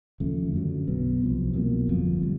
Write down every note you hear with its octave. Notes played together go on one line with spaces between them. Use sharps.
D#2 C#3 F3 A3
F#2 D3 F#3
B1 B2 F#3 B3
C2 C3 F3
C2 B2 F#3 A#3
G1 F2 C#3 F3
D3 G3